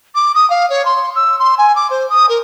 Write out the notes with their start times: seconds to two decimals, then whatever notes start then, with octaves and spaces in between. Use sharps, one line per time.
0.15 D6
0.35 D#6
0.50 F5
0.70 C#5
0.85 C6
1.15 E6
1.39 C6
1.58 G#5
1.75 D6
1.90 C5
2.10 D#6
2.29 A#4